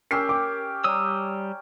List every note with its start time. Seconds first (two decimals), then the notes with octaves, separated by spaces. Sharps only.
0.11 C#4 G4 A#4 E6 C7
0.29 D6
0.84 G3 C#5 D5 A#5 D#6 E6